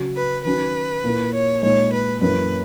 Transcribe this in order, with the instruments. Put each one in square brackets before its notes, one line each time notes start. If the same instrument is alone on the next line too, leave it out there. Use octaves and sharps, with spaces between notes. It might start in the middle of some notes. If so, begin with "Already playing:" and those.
Already playing: [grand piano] C#3 F#3 C#4 F#4
[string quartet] B4
[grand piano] D#3 F#3 C#4 F#4 [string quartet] B4
[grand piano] A#2 A#3 E4
[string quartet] C#5
[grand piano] A#2 G#3 D#4 [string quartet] C#5
[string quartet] B4
[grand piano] F#2 E3 A#3 [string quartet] B4